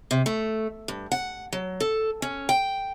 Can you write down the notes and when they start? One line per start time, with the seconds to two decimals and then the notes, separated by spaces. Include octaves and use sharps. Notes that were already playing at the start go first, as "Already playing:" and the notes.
0.11 C3
0.26 A3
0.88 G2
1.12 F#5
1.53 F#3
1.81 A4
2.22 C#4
2.49 G5